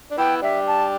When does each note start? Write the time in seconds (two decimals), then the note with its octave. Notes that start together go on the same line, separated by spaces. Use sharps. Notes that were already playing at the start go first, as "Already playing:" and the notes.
0.11 D4
0.18 B3 E4 G5
0.42 D4 G4 E5
0.67 A5